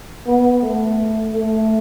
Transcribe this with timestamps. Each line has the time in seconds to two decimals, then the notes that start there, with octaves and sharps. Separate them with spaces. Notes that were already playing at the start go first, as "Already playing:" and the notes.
0.27 B3
0.62 A3
1.34 A3